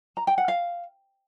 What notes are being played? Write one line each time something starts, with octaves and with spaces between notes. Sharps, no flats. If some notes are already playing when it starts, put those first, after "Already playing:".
A#5
G5
F#5
F5